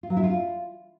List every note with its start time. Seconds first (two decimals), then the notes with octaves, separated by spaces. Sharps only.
0.03 F4
0.10 F#3
0.17 E4
0.24 F4